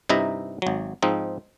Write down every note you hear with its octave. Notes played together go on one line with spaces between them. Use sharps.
G2 C3 D#4 E4 E5 A#5
G#1 F#3
G#2 F3 C4 D#4